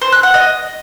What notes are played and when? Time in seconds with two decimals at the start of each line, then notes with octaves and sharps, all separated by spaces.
0.02 C5
0.12 F#6
0.23 F#5
0.34 D#5